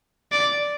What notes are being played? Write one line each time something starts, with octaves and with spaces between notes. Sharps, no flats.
D5